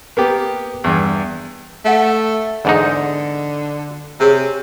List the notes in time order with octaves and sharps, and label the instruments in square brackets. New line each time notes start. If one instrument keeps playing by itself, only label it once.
[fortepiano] A#3 B3 G4
E2 G2
[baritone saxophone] A3 [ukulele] E5 F#5
[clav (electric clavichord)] E2 G#2 D#4 [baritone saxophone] D3
[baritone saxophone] C3 [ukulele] G#4 C#5